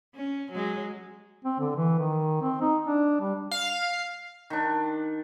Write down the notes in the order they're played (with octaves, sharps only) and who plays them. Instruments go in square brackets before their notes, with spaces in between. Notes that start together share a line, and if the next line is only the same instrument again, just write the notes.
[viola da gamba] C#4
F#3 G#3
[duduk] C4
D3
E3
D#3
C4
D#4
D4
G3
[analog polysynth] F5
[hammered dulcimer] D#3 D4